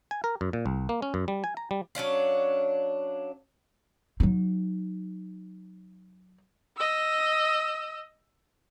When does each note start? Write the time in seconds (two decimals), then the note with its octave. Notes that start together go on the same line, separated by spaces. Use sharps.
0.11 G#5
0.24 A#4
0.41 F#2
0.53 A#2
0.66 C2
0.89 A#3
1.02 C#4
1.14 F#2
1.28 G3
1.44 G#5
1.57 A#5
1.71 G3
1.95 F#3 C#4 D4 F5
4.20 F#3 D#4
6.77 D#5 E6